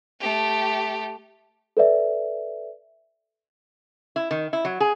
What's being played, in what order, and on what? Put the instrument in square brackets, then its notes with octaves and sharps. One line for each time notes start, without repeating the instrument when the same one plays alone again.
[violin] A3 G4
[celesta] A4 B4 D5 E5
[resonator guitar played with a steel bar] E4
D#3
E4
F#3
G#4